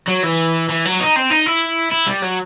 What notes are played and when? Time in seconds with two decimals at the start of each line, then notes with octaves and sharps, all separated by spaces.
0.08 F#3
0.24 E3
0.69 E3
0.85 F#3
1.00 D#4
1.16 C4
1.30 D#4
1.46 E4
1.92 E4
2.07 G3
2.22 F#3